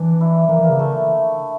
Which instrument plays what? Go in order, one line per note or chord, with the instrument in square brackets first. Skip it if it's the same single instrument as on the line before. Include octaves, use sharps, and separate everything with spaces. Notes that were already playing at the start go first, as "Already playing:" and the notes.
Already playing: [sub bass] E3 [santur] D4
[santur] E4
[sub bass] E3 [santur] A#3
[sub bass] E3
[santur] A#3
[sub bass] C#3
[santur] A3